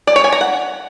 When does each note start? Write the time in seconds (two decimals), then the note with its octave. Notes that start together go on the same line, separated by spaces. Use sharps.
0.07 D5
0.16 C#5
0.24 G#5
0.32 A#5
0.41 F#5